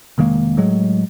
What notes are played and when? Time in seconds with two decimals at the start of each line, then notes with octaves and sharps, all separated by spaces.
0.18 F1 D#3 G#3 A#3
0.57 A2 F#3 G#3